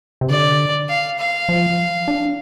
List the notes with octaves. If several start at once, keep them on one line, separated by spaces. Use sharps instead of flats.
C3
D3 D5
F5
F5
F3
D4